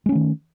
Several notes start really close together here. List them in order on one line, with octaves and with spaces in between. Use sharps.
G#3 C#4 A3 D#3